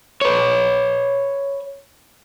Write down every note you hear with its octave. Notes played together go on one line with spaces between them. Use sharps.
B4 C#5